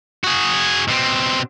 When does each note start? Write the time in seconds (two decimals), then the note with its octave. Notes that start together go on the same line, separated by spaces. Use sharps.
0.24 F#4 G#4
0.88 B2 C4